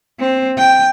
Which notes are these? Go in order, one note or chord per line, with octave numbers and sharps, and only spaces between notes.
C4
G5